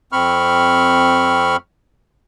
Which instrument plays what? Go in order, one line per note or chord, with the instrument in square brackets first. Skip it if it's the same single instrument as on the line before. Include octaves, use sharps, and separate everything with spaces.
[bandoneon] F2 C4 B5 C#6 F6